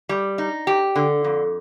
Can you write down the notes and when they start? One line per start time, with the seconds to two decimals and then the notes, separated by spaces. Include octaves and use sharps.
0.09 G3
0.38 D#4
0.67 G4
0.96 D3
1.24 F2